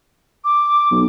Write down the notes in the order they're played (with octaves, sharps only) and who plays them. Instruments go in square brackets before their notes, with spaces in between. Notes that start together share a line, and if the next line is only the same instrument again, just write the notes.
[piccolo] D6
[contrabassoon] B1